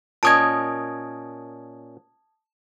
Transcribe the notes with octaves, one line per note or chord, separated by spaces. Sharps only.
A#2 C#4 D#5 A5 D#6 G#6